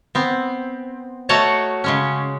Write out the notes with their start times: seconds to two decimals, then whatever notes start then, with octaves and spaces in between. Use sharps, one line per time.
0.15 B3 C4
1.29 A3 F#4 C#5 D#5 A5 A#5
1.84 C#3 G#3 C#4